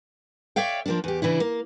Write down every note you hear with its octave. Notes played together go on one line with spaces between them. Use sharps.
C#5 D5 E5 F5 G5
F3 A#3 D4
E2 G4
C#3 E3 D4 E4
A#3